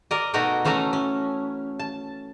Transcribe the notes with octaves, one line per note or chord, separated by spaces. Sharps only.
A#4 D5 D#5
B2 A3 D#4 F#4 A#4 D#5
E3 A3 C#4 A4 A#5
C#4
A5